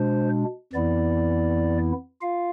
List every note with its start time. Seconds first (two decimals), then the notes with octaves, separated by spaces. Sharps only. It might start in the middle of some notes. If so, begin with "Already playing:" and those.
Already playing: B2 G#3 D4 C5
0.73 F2 E3 B3 E4 D5
2.21 F4 F5